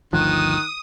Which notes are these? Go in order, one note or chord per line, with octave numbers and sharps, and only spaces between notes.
G1 D2 D#3 F3 D#6 F#6